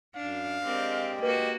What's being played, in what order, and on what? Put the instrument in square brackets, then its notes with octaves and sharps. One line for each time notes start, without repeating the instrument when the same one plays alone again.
[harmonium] F#2 [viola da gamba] D4 [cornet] F5
[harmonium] G#3 G4 [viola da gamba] C4 A#4 D5
[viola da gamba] A#3 F#4 [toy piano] B4